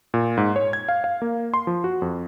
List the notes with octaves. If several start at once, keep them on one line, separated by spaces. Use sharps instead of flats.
A#2
G#2
C#5
G#6
F5
F5
A#3
C6
F3
F#4
F2